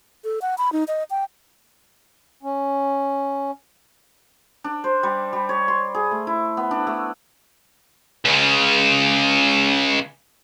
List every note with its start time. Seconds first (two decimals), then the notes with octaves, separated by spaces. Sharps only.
0.24 A4
0.42 F#5
0.58 B5
0.73 D#4
0.88 D#5
1.10 G5
2.43 C#4
4.64 D4
4.84 C5
5.03 G3
5.33 G3
5.49 C#5
5.68 C6
5.95 G#4
6.11 A3
6.27 E4
6.57 B3
6.71 D4
6.87 A3
8.25 C#2 C#3